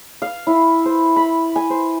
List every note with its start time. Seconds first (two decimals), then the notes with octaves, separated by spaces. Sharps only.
0.22 F5
0.47 E4
0.85 C5
1.16 B5
1.56 G#5
1.70 C5